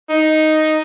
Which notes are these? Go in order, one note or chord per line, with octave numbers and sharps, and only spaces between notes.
D#4